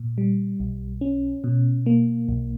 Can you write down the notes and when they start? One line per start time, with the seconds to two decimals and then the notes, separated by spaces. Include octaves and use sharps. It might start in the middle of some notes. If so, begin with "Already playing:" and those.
Already playing: A#2
0.18 G3
0.60 B1
1.01 C#4
1.44 B2
1.86 A#3
2.29 B1